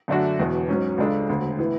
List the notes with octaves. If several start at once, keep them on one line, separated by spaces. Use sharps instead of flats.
F#2 D3 A3 D4 F#4
E1 E2 B2
G#2 F#3 C#4
C#2 C#3 G#3 D4 A4
E1 D2 D3
A2 E3 B3